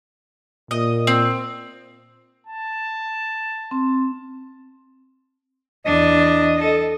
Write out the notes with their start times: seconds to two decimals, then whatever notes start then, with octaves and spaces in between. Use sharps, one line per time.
0.71 A#2 D#5
1.07 C4
2.46 A5
3.71 C4
5.85 E2 D4 D#5
6.59 A4